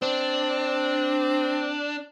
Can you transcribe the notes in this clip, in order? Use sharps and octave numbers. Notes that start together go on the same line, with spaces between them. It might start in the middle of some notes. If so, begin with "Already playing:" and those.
C4 D4